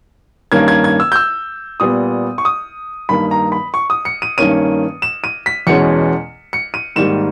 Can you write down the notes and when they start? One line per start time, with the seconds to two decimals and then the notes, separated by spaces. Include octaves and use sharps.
0.52 G2 D#3 A#3 C#4 G#6
0.68 G#6
0.84 G#6
1.00 E6
1.12 G6
1.16 E6
1.80 A#2 G3 B3 D#6
2.38 C#6
2.45 D#6
3.09 G2 D#3 A#3 B5
3.31 A#5
3.52 B5
3.74 C#6
3.90 D#6
4.05 C#7
4.22 D#7
4.38 G2 D#3 A#3 C#4 D#7
5.02 E7
5.24 D#7
5.46 B6
5.67 E2 B2 G#3 C#4 C#7
6.53 C#7
6.74 D#7
6.96 G#2 D#3 G3 A#3 E7